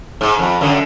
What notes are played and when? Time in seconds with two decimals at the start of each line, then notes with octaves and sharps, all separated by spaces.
0.21 G#2
0.39 F2
0.61 F#2 D3